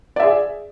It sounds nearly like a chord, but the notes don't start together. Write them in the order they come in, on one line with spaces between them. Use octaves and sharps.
D5 E5 G#4